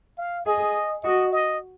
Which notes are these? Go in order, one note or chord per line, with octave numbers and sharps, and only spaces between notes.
F5
G#4 D#5
F#4 D#5
D#5